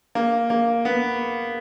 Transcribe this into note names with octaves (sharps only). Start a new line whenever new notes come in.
A#3
A#3
B3